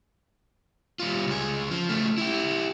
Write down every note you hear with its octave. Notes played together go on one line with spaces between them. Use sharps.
G3 F4
C#2 G#4
F3
C#3 A3
E4 G4